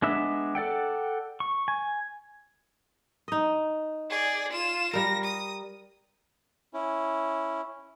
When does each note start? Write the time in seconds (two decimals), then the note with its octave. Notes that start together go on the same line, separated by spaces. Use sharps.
0.02 G#3 B3 D4 E5
0.55 A4 D5 F#5 G5
1.40 C#6
1.68 G#5
3.28 D#4 D#5
4.10 G#4 D5
4.52 F4 E7
4.93 G3 A#4 A#6
5.24 D#6
6.74 C#4 E4